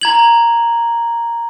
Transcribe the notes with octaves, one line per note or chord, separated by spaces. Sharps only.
A#5 G#6 F#7